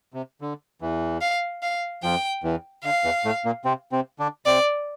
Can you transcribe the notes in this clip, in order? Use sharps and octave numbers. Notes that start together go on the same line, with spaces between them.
C3
D3
E2 E3
F5
F5
F2 F3 G5
E2 E3
D3 F5
E2 E3
A2 A3
A#2 A#3
C3 C4
C3 C4
D3 D4
C3 C4 D5